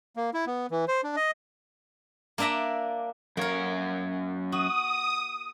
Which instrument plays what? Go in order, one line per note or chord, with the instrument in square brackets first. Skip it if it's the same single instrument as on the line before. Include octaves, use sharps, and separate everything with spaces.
[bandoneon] A#3
E4
B3
E3
C5
D4
D#5
[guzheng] A#3 D4 D5 E5 A#5
[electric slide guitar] F#2 C#5 [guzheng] A#3 A#4
[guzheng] F#4 [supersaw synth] D#6